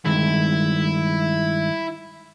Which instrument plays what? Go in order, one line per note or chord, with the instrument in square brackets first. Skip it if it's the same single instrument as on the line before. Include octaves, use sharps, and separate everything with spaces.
[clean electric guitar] G2 D#3 G#3 [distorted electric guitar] E4